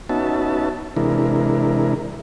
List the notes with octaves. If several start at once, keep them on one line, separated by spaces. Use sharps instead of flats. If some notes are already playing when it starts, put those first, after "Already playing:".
B3 C#4 D#4 F#4 E5 A5
C3 E3 G#3 D4 E4 A#4